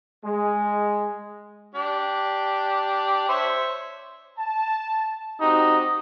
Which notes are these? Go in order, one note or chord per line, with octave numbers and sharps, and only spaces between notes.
G#3
D4 G4
C5 C#5 E5
A5
C4 D#4 F#4 G4